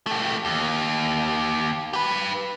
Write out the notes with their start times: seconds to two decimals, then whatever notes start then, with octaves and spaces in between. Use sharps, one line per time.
0.07 A3 G4
0.45 D#2
1.93 G4 B4